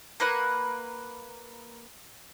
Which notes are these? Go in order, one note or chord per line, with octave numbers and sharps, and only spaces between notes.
A#3 A#4 B4 F#5